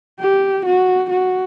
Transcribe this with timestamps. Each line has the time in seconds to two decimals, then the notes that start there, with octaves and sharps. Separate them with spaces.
0.21 G4
0.66 F#4
1.10 F#4